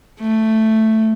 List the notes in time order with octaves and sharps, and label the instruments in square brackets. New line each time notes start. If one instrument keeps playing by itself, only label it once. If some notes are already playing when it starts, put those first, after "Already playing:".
[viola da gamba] A3